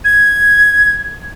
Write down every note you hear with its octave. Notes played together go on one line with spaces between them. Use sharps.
G#6